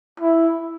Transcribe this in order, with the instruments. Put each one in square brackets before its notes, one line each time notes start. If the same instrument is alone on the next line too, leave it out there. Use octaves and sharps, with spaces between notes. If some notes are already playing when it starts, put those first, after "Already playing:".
[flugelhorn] E4